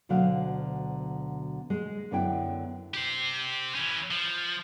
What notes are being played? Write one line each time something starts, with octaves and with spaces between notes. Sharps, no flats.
D2 B2 D3 F#3 C5 F5
G#3
F#2 D3 B3 E4 G5
G4 C5
E3 C#4
F3